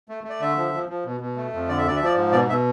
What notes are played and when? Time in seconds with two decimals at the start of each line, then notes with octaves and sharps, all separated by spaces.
0.09 A3
0.24 A3
0.30 D5
0.40 D3 E5
0.57 F3
0.73 F3
0.89 F3
1.05 B2
1.21 B2
1.36 A3
1.53 F2
1.68 D3 D5
1.78 E5
1.85 D2 D5
1.96 E5
2.01 F3 D5
2.16 G#2
2.32 B2 D5
2.48 B2 E5